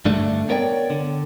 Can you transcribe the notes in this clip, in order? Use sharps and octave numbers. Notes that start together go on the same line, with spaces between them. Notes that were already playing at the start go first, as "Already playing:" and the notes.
G2 D3 A3 D4
B3 A#4 C#5 D5 G5
D3